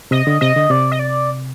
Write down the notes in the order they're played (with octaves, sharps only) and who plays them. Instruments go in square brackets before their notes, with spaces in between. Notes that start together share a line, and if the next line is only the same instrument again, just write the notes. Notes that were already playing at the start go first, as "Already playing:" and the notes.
[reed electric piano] C3 [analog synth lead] D#5
[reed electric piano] D3
[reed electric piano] C3 [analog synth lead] D#5
[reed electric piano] D3
[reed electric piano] C3 [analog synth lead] D5
[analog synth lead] D#5
D5